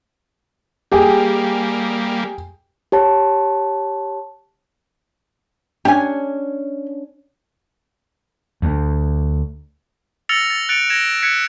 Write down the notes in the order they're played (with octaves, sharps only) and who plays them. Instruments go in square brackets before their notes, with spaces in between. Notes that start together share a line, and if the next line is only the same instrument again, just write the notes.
[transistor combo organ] G3 A#3 [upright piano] G4 G#4 G5
[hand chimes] G4 C#5 A5
[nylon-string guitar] C#4 D4 [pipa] G4 G#5
[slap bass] D2
[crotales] E6 F6 A6 A#6 C#7 F7
A6
F#6 A6 C#7 D7 F7
G#6 A#6 E7
F#6 G#6 B6 C#7